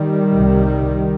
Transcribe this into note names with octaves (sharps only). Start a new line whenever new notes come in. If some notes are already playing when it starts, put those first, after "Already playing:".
Already playing: D#3 G3
C2 C3